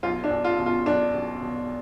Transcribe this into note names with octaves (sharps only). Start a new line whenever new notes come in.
B1 F4
D4
B1
F4
B2
F4
B1 D4
B2
B2